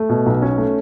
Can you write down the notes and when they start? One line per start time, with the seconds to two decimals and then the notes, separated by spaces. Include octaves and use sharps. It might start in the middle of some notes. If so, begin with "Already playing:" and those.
Already playing: A3
0.09 B2
0.26 B1
0.42 C#4
0.58 A3